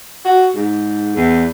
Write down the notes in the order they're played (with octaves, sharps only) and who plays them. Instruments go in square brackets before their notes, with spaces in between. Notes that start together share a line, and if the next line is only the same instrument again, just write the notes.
[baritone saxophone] F#4
G#2
E2